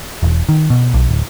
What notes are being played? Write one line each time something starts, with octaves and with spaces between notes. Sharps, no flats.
E1
D#3
B2
B1
D1